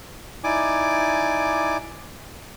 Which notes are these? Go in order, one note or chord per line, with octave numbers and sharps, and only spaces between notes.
D#4 E4 D5 G#5 D6